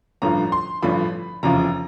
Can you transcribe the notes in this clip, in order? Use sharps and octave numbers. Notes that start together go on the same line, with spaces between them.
A1 G2 D3 F3 A#5
C6
A1 G2 D3 F3 B5
F1 E2 C#3 F3 A#5